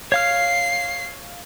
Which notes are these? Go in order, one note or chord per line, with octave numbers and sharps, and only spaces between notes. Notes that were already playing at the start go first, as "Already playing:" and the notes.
C#5 F5 F6 C7